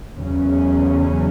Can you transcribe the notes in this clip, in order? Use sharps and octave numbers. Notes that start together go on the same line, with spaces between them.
E2 C#3 F#3 C#4